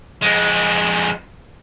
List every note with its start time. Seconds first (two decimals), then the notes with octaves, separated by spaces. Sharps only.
0.22 F2 G#3